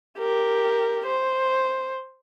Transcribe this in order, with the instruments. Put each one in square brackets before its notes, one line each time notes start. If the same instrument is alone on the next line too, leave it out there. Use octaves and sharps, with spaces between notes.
[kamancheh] G4 A#4
C5